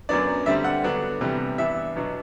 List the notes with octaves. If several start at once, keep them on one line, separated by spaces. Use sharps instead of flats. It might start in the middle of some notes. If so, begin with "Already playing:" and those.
F#2 F#3 B3 D4 D5
D3 G3 C4 E5
F#5
D3 F#3 B3 D4
C3 E3 G3 B3
G2 E3 B3 D4 E5
B2 F#3 B3 D4